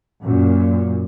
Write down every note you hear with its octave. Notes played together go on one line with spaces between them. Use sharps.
F#2 A#2